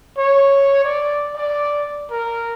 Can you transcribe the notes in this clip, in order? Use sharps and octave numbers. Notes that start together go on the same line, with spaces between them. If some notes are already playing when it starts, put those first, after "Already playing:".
C#5
D5
D5
A#4